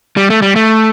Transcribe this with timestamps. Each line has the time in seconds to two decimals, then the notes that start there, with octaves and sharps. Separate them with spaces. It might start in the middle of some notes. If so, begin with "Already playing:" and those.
0.17 G3
0.30 A3
0.42 G3
0.56 A3